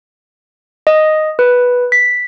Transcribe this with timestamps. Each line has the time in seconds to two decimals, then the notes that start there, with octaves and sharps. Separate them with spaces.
0.87 D#5
1.39 B4
1.92 B6